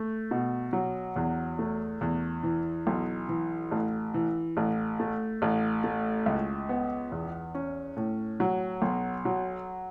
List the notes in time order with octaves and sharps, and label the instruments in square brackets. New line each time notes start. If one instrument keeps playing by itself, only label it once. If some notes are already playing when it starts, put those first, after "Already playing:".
Already playing: [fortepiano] A3
B2
F#3
E2
A3
E2
E3
B1
E3
A1
E3
A1
A3
A1
A3
C#2
B3
E2
C#4
A2
F#3
B1
F#3